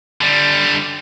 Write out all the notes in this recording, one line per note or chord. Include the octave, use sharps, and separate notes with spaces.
D3 G3